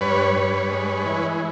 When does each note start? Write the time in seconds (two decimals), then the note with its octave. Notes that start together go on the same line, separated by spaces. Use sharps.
0.01 G2 B4 C#5
0.36 G2
0.71 G#3
1.06 E3